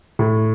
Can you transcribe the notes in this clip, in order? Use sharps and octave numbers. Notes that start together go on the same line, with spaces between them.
A2